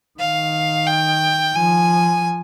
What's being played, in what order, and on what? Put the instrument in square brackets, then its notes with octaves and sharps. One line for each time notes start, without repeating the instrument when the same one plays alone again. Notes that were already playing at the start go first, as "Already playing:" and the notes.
[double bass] D#3 [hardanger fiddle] F5
[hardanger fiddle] G5
[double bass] F3 [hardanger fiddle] G#5